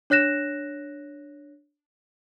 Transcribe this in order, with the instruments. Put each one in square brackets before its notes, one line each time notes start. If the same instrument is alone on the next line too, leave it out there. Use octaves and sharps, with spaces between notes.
[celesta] D4 C#5 F#6 A#6 E7